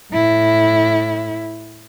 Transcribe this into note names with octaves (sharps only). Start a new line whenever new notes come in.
A2 E4